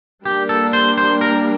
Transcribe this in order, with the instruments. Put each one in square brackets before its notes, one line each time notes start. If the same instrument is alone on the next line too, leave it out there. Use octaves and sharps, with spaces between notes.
[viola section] G3 A#3 D4 [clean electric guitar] G4
[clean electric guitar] A4
C5
C5
A#4